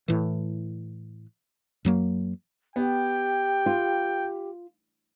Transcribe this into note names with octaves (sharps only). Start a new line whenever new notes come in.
A2 E3
F#2 F#3 A#3
B3 G4 G5
F4